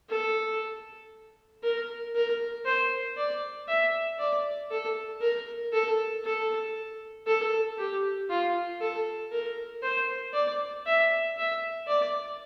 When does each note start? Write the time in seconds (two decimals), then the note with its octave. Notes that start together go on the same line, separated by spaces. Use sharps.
0.09 A4
1.63 A#4
2.15 A#4
2.65 C5
3.16 D5
3.67 E5
4.19 D5
4.70 A4
5.21 A#4
5.73 A4
6.24 A4
7.27 A4
7.78 G4
8.30 F4
8.81 A4
9.31 A#4
9.83 C5
10.33 D5
10.86 E5
11.37 E5
11.87 D5